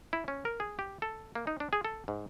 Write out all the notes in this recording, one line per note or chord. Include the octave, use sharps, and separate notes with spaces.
E4
C#4
A#4
G#4
G4
A4
A#3
D#4
D4
G#4
A4
G#2